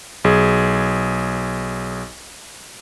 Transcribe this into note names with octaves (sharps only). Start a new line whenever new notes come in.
B1 G#4